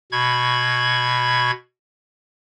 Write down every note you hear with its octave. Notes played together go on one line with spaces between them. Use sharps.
B2 B5 C#6 G#6